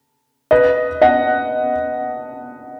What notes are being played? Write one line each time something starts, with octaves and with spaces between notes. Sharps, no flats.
B4 D#5
D#5 F#5